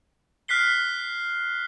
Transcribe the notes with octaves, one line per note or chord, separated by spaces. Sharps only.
F6 F#6 B6 C7 G7